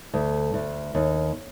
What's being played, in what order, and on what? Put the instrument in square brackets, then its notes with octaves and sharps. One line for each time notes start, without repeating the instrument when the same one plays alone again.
[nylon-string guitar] D2
D2
D#2